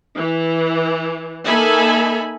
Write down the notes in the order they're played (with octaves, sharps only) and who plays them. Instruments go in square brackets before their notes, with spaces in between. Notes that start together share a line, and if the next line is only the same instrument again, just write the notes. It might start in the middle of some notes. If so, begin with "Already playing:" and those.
[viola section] E3
A#3 D#4 A4 E5 G#5 B5